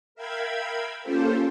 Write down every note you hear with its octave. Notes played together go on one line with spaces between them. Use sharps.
A#4 E5 F5 G5 B5 G#6
A#3 C#4 F4 G4 A4 C5